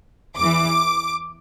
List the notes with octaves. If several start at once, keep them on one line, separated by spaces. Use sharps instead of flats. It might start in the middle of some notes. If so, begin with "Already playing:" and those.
E2 E3 D6